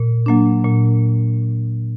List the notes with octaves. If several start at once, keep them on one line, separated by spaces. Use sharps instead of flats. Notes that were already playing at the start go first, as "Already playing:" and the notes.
Already playing: A#2
F#3 A#3 D4
A#2